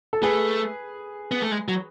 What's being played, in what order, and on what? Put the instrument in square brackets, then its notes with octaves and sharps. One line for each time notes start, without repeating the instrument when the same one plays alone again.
[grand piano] A4
[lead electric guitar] A3 [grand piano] G#4 B4
[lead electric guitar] B3
A3
G#3
F#3